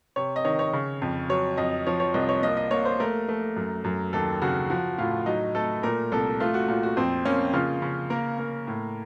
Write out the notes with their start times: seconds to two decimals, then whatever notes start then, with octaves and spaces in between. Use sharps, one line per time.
0.16 C3 C#5
0.36 D#5
0.45 D#3 C#5
0.59 C#5
0.73 C#3
1.02 F2
1.29 F#3 C#5
1.57 F2 D#5
1.87 F3 C#5
2.00 C#5
2.14 C2 D#5
2.29 C#5
2.42 A#3 D#5
2.57 D#5
2.71 A#3 C#5
2.85 C5
3.00 A3 A#4
3.28 A3
3.56 F#2
3.84 F#2
4.13 D#2 A4
4.42 C#3 F#4
4.70 F3 F#4
4.98 A2 F4
5.26 F#3 D#4
5.55 A3 A4
5.83 A#2 A#4
6.12 C2 A4
6.40 A3 F4
6.54 F#4
6.68 A#2 F4
6.83 F#4
6.97 F2 C4
7.25 A#3 C#4
7.53 C#3 F4
7.82 C#3
8.10 A#3 A#4
8.39 A#3
8.67 A2